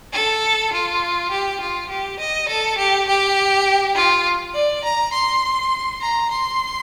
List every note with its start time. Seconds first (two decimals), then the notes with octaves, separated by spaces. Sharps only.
0.13 A4
0.73 F4
1.31 G4
1.61 F4
1.89 G4
2.19 D#5
2.48 A4
2.78 G4
3.08 G4
3.96 F4
4.55 D5
4.84 A#5
5.13 C6
6.01 A#5
6.31 C6